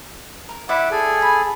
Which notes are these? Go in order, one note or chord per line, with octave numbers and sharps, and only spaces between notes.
A#4
E4 D5 E5 F#5 D6
G#4 A4 G#5
B5